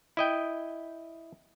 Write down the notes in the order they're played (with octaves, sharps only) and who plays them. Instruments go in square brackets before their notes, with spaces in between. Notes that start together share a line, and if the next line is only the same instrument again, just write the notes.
[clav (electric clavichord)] E4 D#5 G5